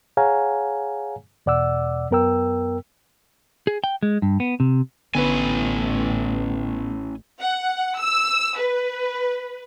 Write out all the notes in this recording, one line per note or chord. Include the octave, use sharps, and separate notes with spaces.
G#4 C#5 F5 F#5 G#5 A#5
E2 B2 D5 F#5 D6 E6
F#2 B3 A#4 G5 E6
G#4
G5
G#3
G2
B3
C3
A1 D3 B3 C#4 E4 B4 G#5
F#5
E6
B4